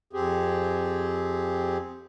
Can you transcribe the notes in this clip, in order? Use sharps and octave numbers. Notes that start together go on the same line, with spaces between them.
F2 C4 G4 G#4